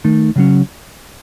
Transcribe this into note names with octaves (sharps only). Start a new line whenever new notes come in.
D#3 A3 D#4
C#3 F#3 C#4